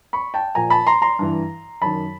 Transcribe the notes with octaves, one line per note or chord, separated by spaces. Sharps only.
B5 C#6
G5 A5
A#2 F3 G#5 A#5
A5 B5
A#5 C6
A#5 C6
G2 E3
F#2 D#3 A5 B5